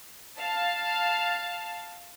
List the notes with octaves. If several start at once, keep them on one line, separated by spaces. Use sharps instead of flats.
F5 A5